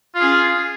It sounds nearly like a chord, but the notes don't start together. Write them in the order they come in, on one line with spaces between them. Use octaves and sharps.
F4 G#4 C#4